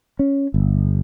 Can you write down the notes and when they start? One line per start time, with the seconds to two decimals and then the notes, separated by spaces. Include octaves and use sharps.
0.19 C#4
0.54 G1